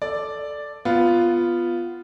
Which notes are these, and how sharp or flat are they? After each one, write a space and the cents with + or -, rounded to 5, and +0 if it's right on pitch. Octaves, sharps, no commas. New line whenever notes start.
A4 +0 D5 +0
B3 +0 F4 -5